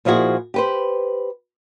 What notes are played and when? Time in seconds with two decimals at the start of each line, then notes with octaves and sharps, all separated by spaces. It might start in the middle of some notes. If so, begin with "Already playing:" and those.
0.05 A#2 F3 E4 F#4 G#4
0.54 G4 B4 C5